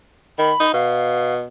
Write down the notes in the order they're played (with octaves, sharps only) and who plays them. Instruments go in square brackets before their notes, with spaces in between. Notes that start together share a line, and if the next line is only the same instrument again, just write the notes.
[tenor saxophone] D#3 [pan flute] B5
[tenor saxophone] D#4
[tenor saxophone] B2 [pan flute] F5